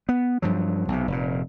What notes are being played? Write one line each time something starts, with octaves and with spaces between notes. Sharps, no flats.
B3
G2 F3 F#3
B1 C3
F1 A#2